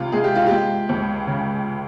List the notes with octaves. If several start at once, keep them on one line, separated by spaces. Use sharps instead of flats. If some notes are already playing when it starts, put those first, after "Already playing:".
Already playing: C#2 C3 F4
G#3 G#4
G4
F4
G#3 G4
C#2
C#3